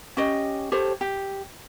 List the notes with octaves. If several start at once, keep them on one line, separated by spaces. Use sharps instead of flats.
C#4 G4 D#5
G4 A4 C5 C#5
G4